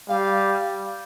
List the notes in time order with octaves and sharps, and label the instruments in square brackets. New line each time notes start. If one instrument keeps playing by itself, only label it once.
[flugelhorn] G3 [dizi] F5